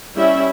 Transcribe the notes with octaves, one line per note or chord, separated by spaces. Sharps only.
G3 C#4 E4 E5